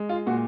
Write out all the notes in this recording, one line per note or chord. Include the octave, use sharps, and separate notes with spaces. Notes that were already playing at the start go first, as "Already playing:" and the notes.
Already playing: G#3
F4
A#2 F#4